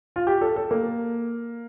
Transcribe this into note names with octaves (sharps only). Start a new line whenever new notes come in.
F4
G4
A4
A4
A#3